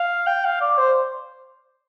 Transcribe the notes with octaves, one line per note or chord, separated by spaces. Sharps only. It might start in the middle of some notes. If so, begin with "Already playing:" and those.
Already playing: F5
G5
F5
D5
C5